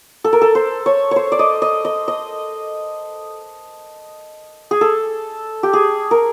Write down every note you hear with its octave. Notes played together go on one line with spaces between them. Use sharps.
A4
A#4
A4
C5
C#5
C5 C#5
D5
D#5
D#5
D#5
D#5
G#4
A4
G4
G#4
A#4